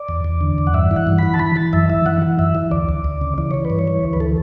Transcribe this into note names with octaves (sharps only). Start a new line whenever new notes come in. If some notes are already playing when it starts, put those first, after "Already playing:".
Already playing: D5
E2
E2
D3
E2
F#5
G2 E5
E3
F#5
G2
E3 B5
A5
E3 B5
E3 A5
F#2 E5
E3 E5
E3 F#5
E3
F#2 E5
E3
D2 D5
D2
D2
C#3
E3 D5
E3 C#5
B4
G2
C#5
E3
D2
B4
E3 A4